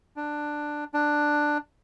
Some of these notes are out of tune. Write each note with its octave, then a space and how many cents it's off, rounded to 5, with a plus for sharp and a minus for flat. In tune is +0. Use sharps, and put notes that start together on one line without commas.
D4 +10
D4 +10